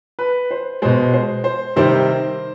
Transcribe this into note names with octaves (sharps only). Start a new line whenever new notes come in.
B4
C5
B2 G#3 C5
C5
C5
C3 D#3 G3 C5